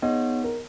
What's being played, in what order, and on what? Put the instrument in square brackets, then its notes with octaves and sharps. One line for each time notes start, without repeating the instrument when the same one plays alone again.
[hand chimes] B3 D#4 G#4 C#5 F#5 [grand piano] D#5
[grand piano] A#4